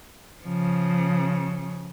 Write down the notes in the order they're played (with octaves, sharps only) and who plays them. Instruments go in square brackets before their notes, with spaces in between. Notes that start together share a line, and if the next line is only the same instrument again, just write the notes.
[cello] C#3 F3